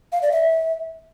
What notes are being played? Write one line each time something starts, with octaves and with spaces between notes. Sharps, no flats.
F5
D5
E5